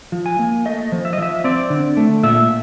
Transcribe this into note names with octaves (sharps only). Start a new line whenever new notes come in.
F3
G#5
A#3
A3 D#5
F3
E5
D#5
F3 E5
C4 D5
D3
A3
A#2 E5